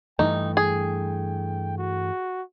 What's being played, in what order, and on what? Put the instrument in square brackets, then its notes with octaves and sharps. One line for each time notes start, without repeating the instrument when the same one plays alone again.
[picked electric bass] G2 E3 A3 [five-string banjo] D#4 [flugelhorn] G5
[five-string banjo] G#4
[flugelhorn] F#4